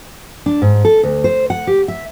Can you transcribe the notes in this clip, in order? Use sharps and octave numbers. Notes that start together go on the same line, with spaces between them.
D4
G#2
A4
D2
C5
F#5
G4
E5